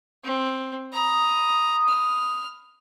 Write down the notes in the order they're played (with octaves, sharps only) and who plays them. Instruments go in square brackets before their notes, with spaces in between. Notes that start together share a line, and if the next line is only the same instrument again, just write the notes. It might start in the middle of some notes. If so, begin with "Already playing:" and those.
[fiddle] C4
[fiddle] A#5 [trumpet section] B5 D#6
[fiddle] F6